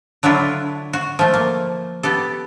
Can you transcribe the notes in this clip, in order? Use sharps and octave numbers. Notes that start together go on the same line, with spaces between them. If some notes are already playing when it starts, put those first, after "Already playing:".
D3 F#3 D4 E4 F4
F#4
F3 A3
A#3
B3 G4 A4